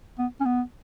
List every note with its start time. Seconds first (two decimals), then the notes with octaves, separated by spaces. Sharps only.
0.19 B3
0.40 C#4
0.46 B3